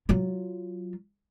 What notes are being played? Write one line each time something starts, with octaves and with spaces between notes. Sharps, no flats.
F#3 F4